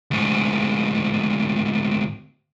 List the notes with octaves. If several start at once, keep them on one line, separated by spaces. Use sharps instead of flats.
D2 G#2